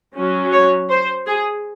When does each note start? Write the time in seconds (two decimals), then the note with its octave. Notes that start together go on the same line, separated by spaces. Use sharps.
0.15 F#3 C#4
0.52 C#5
0.89 C5
1.27 G#4